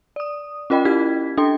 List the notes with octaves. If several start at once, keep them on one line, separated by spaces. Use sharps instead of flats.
D5 D#6
C#4 F4 A#4 D#5 G5 B5
C#4 E4 G4 G#6 B6
D4 A4 G5 C6